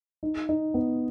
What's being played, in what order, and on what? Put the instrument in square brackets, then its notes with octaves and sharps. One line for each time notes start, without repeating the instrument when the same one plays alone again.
[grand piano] D#4
D#4
B3